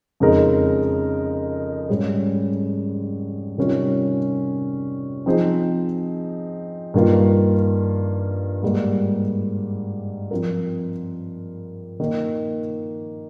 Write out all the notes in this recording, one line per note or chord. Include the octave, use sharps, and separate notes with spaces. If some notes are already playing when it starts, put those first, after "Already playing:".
F2 C#3 G#3 D#4 A#4
G#2 G3 C#4 G#4
C3 D#3 G3 C#4 F4
F3 C4 D#4 G#4 C5
G2 D#3 A#3 F4
G#2 G3 A#3
F3 C4 F4 A#4
D#3 A#3 D#4